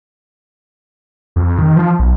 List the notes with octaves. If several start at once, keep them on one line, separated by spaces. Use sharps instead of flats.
F2
D#3
F3
B1